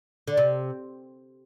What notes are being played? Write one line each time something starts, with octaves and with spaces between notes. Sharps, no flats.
D3
C3